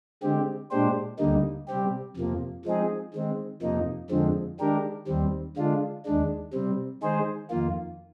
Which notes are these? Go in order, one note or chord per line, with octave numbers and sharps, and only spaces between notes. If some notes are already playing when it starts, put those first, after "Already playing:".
D3 G#3 C4 G4
A#2 G#3 D4 G4 C5
D2 D3 G3 A#3 D#4
C3 G3 C4 G4
F2 C3 F3 A#3
F3 G#3 C4 D#4 G#4
D#3 G#3 C4
F2 C3 F3 A#3 D#4
F2 D3 F3 G#3 C4
D#3 G#3 D4 G4 A#4
D#2 D#3 G3 C4
D3 G#3 D4 F4
D#2 D#3 G#3 D4
C3 G3 C4
D#3 G#3 D#4 G#4 C5
F2 D#3 A#3 F4